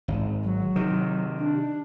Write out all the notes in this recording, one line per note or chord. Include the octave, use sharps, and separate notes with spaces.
G#1
F#3
C3 D#3
D4